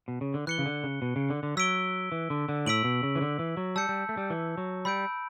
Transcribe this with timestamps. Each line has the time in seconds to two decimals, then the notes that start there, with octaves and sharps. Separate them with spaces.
0.08 B2
0.21 C#3
0.34 D3
0.47 E3 F#6 C#7 G7
0.59 C#3
0.66 D3
0.84 C#3
1.02 B2
1.16 C#3
1.30 D3
1.43 D3
1.57 F#3 E6 B6 D7 G7
2.12 E3
2.30 D3
2.49 D3
2.66 A2 E6 B6 D7 F#7
2.84 B2
3.03 C#3
3.16 E3
3.21 D3
3.39 E3
3.57 F#3
3.76 G3 A5 E6 G6 C#7
3.89 G3
4.09 A3
4.17 G3
4.30 E3
4.58 F#3
4.85 G3 B5 E6 G6 D7